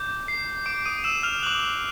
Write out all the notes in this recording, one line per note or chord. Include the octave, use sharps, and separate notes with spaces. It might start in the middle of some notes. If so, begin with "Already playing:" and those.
Already playing: D6 G6
C7
D6 D7
D#6 D#7
E6 E7
F6 F7
D6 F#6 F#7